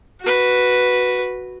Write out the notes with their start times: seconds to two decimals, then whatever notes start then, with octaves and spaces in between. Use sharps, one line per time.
0.22 F#4 B4